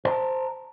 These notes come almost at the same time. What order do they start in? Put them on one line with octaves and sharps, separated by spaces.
C5 A#5 A5